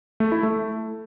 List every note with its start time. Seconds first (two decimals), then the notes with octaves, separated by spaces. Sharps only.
0.20 A3
0.32 E4
0.43 A3